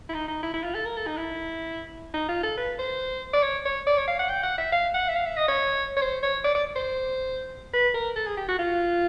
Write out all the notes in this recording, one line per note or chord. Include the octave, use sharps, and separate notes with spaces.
E4
D#4
D#4
E4
E4
F4
A4
A#4
A4
D#4
E4
D#4
F4
A4
B4
C5
D5
C#5
C#5
D5
C#5
F5
F#5
G5
F#5
E5
F5
F#5
E5
F5
E5
D#5
C#5
C#5
C5
C#5
D5
D5
C5
B4
A#4
A4
G#4
G4
F#4
F4